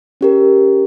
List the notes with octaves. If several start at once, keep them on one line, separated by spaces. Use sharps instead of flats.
C#4 G4 A#4